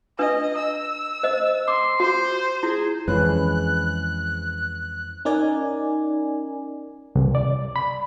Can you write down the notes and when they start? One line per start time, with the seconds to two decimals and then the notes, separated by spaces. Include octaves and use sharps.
0.19 D4 B4 D#5
0.59 E6
1.23 C5 D#5
1.68 C6 D6
2.00 F#4 C5
2.63 E4 G#4
3.08 F2 E3 G#3 C#4 B4 F#6
5.25 C#4 D#4 A#4 D5 G#5
7.15 C2
7.35 D5
7.76 B5